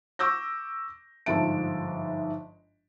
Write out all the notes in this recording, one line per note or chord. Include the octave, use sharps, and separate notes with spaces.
C#6 D6 E6 G6 A#6
G1 G#2 F3 E5 A5 D7